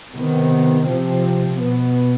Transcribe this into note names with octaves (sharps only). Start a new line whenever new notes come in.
C3 D#3 B3
C3 F3 C4
B2 B3